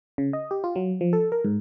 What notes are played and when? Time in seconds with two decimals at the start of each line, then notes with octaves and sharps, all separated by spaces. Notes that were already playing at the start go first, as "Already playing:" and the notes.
0.18 C#3
0.33 D#5
0.51 G4
0.64 F4
0.76 F#3
1.01 F3
1.13 A4
1.32 A#4
1.44 G#2